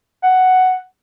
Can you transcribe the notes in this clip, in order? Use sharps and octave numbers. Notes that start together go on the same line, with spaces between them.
F#5